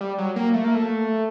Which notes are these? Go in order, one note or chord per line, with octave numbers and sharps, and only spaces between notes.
G3
F#3
A#3
A3
A#3
A3